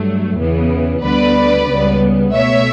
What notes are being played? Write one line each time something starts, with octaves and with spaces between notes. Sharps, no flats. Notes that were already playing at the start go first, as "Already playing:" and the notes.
Already playing: G2 F#3 A3
E2 C#3 E3 B3
D2 D3 G3 B3 B4 D5
C#2 C#3 G3 B3
B2 A3 C#5 E5